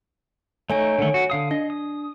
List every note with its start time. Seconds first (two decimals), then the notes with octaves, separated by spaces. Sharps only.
0.70 A3 D#4 C#5 G#5 D7
0.98 D3 D#3 A3
1.14 F#4
1.30 D3 F5 D#6
1.51 D4 D#5
1.70 D#6